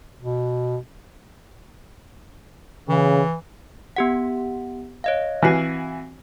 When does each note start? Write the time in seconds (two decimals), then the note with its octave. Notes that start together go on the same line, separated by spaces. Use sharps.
0.21 B2
2.89 C#3 E3
3.96 B3 G4 F#5
5.04 C#5 D#5 F5
5.42 E3 C4 F#4 G#5 C7